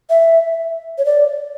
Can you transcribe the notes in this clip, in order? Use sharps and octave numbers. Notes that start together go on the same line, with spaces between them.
E5
C#5
D5